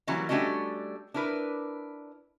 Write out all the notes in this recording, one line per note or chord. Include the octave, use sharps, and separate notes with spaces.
E3 F#3 G3 A#3 C#4
G3 A3 C#4 D4 F#4 D#5
D4 E4 A#4 B4